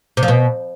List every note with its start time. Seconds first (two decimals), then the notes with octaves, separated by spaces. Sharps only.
0.17 C3
0.23 F3
0.28 B2